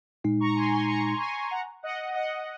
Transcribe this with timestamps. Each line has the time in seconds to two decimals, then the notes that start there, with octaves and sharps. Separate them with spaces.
0.24 A#2 G#3 D#4
0.40 A#5 C#6
0.56 G#5 C6
0.72 G#5 C6
0.88 A#5 C#6
1.20 G#5 C6
1.51 F#5 A#5
1.83 D#5 F#5
2.15 D#5 F#5